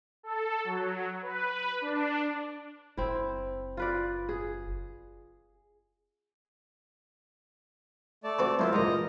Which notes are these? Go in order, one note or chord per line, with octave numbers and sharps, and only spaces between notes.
A4
F#3
B4
D4
F#1 C4 E4
F4 B4 D5
G#4
A3 D5 A5
C4 F#4 B4
F#3 A#3 B3 E4 F4 C5
E2 G2 A#2 D#5 A#5